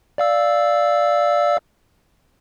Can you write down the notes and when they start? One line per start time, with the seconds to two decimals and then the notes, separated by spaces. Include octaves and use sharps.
0.18 D5 F5 E6